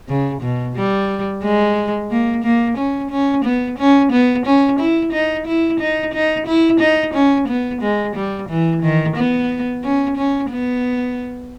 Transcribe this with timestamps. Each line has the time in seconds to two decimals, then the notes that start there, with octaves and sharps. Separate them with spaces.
0.08 C#3
0.42 B2
0.75 G3
1.43 G#3
2.10 A#3
2.44 A#3
2.77 C#4
3.11 C#4
3.44 B3
3.78 C#4
4.12 B3
4.46 C#4
4.79 E4
5.12 D#4
5.47 E4
5.80 D#4
6.13 D#4
6.46 E4
6.80 D#4
7.14 C#4
7.48 B3
7.81 G#3
8.16 G3
8.49 E3
8.82 D#3
9.16 B3
9.84 C#4
10.17 C#4
10.51 B3